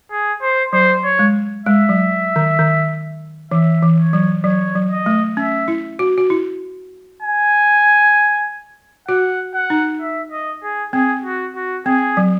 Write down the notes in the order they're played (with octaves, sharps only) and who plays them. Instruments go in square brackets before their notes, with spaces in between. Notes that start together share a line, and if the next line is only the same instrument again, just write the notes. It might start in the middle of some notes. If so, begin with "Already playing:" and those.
[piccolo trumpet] G#4
C5
[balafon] F#3 [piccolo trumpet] C5
[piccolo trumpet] C#5
[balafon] G#3
[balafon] G#3 [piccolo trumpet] E5
[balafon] F#3
D#3
D#3
[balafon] E3 [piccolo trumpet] E5
[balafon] E3
[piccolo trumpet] C#5
[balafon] F#3
[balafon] F#3 [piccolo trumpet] C#5
[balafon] F#3
[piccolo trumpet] D#5
[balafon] A3
[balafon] C#4 [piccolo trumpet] E5
[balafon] E4
F#4
F#4
E4
[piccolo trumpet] G#5
[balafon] F#4 [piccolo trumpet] F#5
[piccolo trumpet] F#5
[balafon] D#4
[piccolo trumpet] E5
D#5
G#4
[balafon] C4 [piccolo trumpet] G#4
[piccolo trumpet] F#4
F#4
[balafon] C4 [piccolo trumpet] G#4
[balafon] F#3